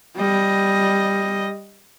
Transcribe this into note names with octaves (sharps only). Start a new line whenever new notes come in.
G3 D#5